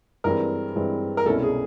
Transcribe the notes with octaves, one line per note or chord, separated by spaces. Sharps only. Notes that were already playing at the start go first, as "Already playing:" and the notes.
G2 E3 G#3 C4 A#4
G2 E3 G#3 C4
A#4
C2 B2 G#3 C#4 E4 A4
G#4